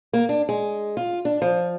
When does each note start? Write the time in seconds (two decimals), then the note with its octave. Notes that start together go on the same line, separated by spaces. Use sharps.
0.13 A#3
0.29 D4
0.49 G#3
0.97 F4
1.25 D4
1.42 F3